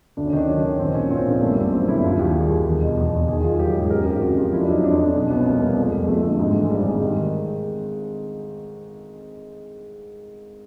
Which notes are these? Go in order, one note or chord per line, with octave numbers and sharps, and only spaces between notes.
D2 D4
C#4
D#3 D4
F#3 C#4
D#3
A#1 C4
A#2 C#4
A#2 C4
A#1 A#3
G1 A3
G3
F#2 A#3
F#3 C4
G1 E4
D#2 F4
D#2 G4
G3 G#4
D#2
E2
B2
E2
E2
D#3 G#4
D#3 F4
F#3 G4
G#2 G#4
F#2 A#4
G#1 G4
C#3 F#4
F3 F4
F2 E4
D4
F#3 D#4
F2 D4
F2 D4
B2 C#4
C2 B3
C2 A#3
G3 A#3
F2 G#3
F2 G#3
F2 A3
D3 A3
G#2 G#3
A3
E3 G#3
G#1 G3
G#2 G#3
D#3